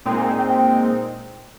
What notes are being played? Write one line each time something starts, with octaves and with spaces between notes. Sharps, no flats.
A#2 G#3 C4 D#4 G5
G#5
G5
G5
G5